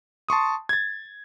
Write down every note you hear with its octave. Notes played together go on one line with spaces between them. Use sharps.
A5 C6 C#6 D#6
G#6 A6